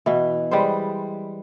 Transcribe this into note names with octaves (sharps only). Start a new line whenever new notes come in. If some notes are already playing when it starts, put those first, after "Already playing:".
B2 E3
G3 G#3 B4 C5